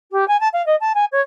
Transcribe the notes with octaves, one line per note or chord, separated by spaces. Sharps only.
G4
G#5
A5
F5
D#5
A5
G#5
C#5